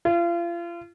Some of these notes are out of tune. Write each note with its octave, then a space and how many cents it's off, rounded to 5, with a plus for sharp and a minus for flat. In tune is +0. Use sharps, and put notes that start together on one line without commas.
F4 -35